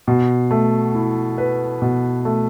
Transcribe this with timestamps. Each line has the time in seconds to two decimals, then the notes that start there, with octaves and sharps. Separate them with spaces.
0.08 B2
0.51 A3
0.95 E4
1.38 B4
1.82 B2
2.25 A3